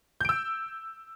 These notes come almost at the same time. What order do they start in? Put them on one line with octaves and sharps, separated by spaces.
G6 D7 E6